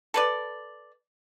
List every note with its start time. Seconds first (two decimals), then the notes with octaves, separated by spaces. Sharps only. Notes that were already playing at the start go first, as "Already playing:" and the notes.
0.14 A4 B4 D5